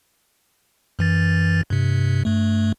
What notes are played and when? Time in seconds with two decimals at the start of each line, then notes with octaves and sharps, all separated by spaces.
0.99 F#2 E3 A6
1.70 G2 C3
2.25 G2 A3